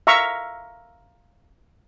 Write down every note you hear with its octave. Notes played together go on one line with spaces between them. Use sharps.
E5 F5 A#5 C#6